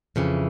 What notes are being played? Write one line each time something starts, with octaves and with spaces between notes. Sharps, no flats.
F2 C#3 E3